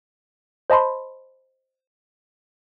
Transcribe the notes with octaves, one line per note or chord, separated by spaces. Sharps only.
C5 D#5 A5 B5 C6